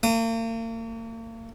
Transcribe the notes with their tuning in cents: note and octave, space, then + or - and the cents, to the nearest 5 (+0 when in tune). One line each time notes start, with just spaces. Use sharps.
A#3 -40 D#6 -35